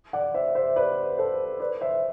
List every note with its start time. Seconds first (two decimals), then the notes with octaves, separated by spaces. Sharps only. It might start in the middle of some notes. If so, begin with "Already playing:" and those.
0.13 D5 F#5
0.34 C5 E5
0.55 C5 E5
0.76 B4 D5
1.18 A4 C5
1.60 B4 D5
1.81 C5 E5